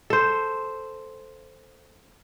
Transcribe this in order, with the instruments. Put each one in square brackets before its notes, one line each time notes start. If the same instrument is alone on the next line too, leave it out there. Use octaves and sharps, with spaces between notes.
[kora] A4 C5